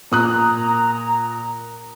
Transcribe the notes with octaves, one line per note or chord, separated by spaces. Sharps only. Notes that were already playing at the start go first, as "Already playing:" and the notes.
A#2 A#5 D#6 F#6